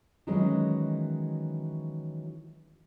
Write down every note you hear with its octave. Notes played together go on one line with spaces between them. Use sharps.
D#3 E3 F#3 G#3 C#4